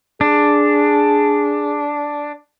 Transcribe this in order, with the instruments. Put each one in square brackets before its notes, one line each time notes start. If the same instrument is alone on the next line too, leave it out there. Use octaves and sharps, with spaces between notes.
[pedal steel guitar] D4 [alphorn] G#4